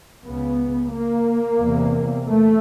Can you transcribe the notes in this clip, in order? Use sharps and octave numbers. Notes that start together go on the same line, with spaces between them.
C#2 C#3 B3
A#3
E2 C3
A3